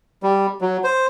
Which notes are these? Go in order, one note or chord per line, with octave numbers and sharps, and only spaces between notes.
G3
F#3
C5